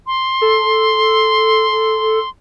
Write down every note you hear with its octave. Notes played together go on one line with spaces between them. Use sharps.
C6
A4